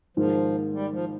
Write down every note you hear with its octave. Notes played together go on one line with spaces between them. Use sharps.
G#2 D#3 F3 A#3
G3
F3